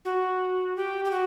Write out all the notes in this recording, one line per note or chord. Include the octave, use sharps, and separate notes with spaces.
F#4
G4
G4
F#4